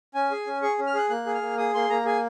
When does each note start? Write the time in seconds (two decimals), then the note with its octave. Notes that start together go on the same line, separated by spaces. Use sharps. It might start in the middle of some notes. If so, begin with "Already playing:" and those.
0.15 C#4 G#5
0.31 G#4
0.47 C#4
0.62 G#4 C#6
0.79 C#4
0.87 F6
0.94 G#4 F#6
1.10 A#3 F#6
1.26 G#4
1.35 F6
1.42 A#3
1.57 G#4 D#6
1.75 A#3 C6
1.90 A#3 A#5
2.05 G#4 G#5